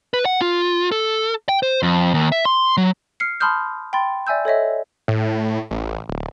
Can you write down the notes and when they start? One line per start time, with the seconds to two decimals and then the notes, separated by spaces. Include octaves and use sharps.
0.14 B4
0.25 F#5
0.41 F4
0.92 A4
1.49 G5
1.63 C5
1.83 F2
2.14 D#2
2.32 E5
2.45 C6
2.77 F#3
3.20 F6 C7 C#7
3.40 A5 B5 C6 D#6 F6 G6
3.93 G5 B5 C6 A6
4.27 D5 E5 G#5 E6 G6
4.45 A4 C#5 D#5 E5
5.08 A2
5.71 A1
6.09 D1